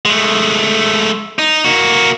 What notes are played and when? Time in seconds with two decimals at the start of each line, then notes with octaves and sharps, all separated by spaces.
0.05 G#3 A3
1.39 D#4
1.65 A#3 F#4